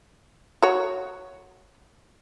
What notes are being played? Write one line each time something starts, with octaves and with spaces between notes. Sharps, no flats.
F#4 C#5